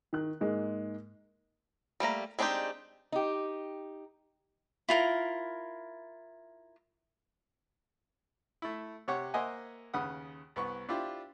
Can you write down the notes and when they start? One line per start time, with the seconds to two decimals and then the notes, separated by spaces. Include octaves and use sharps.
0.13 D#3 F#6
0.41 G#2 G#3 A#3
2.00 G3 A3 A#3 A#5
2.39 G#3 C4 D4 D#4 G4
3.12 D#4 G4
4.89 E4 F4 A#4
8.62 A3 E4
9.08 C3 G4 C#5 F#5
9.34 A#3 C5 D#5 E5 F#5 G#5
9.94 D#2 C#3 B4 F#5 D#6
10.56 C2 B3 C#6
10.89 D4 E4 F4 G4 C5